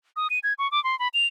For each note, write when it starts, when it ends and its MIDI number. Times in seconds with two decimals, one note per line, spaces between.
0.16 0.28 87
0.30 0.39 99
0.44 0.53 92
0.59 0.70 85
0.71 0.82 86
0.84 0.98 84
0.99 1.08 83
1.14 1.27 101